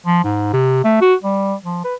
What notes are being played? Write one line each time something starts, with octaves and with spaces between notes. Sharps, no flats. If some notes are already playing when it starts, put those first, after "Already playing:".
F3
G#2
C3
A3
F#4
G3
F3
B4